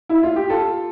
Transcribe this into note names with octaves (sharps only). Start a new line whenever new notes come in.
E4
F4
G4
F4 A4